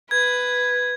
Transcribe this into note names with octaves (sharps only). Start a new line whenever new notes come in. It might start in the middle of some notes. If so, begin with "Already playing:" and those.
B4 G#6